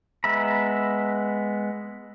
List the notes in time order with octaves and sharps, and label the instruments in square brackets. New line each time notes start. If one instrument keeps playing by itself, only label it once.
[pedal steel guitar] G#3 B3 E5 A#5 B5